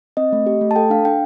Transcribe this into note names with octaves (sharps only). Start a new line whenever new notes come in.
C4 D#5
A3
G4
A3
A5
A4 G5
D4 F5
D4 G5